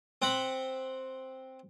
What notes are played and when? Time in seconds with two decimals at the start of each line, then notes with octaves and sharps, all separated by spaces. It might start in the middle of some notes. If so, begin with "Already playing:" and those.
0.22 C4 F#5 B5